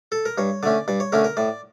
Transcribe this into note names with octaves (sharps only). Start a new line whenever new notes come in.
A4
A#4
G2 C#5
D3 A3 C#4 D5
G2 D5
C#5
D3 A3 C#4 A#4
A#4
A2 D5